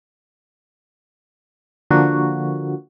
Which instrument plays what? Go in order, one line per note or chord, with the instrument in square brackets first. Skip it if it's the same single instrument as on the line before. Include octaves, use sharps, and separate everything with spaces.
[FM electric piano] D3 F3 A#3 F#4